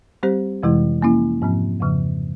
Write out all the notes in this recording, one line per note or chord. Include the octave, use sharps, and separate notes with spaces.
G3 C4 G4 C5
F2 C3 E3 G#3 E4
F3 A#3 C#4 E4
G#2 F3 C4
F2 C#3 F3